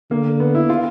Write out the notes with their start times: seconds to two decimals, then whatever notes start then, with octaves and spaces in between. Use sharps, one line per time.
0.11 D3 A#3
0.40 B3
0.55 E4
0.69 F4